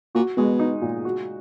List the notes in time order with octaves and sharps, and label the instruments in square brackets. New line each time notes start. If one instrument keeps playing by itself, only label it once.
[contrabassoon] A#2 [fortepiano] F#4
[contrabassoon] B2 [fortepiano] G#3
[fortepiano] D#4
A#2
F#4